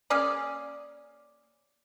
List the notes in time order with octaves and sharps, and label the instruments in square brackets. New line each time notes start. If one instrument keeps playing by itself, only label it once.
[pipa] A#3 C#4 G#4 D5